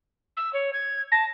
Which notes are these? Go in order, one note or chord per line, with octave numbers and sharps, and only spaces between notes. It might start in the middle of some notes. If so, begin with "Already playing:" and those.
E6
C#5
G#6
A5 A#6